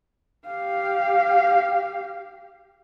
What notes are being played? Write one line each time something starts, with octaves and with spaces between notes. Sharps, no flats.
G4 F5